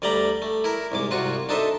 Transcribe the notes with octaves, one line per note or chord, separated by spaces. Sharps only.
D2 G3 D5 G5 A#5 B5
A3
E4 A#4
C2 G#2 D6
C2 C3 F4 F#4 C#6
D4 D#4 A4 C5 E5